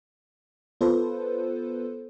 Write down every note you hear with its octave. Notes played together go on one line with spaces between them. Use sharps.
B3 F4 A4 B4 C5